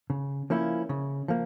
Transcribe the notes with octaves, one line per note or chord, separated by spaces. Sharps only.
C#3
F3 A#3 C#4 E4
C#3
F3 A#3